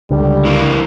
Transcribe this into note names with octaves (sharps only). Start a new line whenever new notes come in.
C#2 D3 G3
E3 A#3